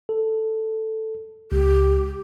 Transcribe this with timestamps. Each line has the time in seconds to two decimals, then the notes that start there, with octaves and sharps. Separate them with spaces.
0.09 A4
1.52 C#2 G4